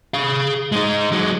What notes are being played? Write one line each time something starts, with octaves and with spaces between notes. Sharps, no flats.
G#4 F5
G#3 D#4
F#3 G#3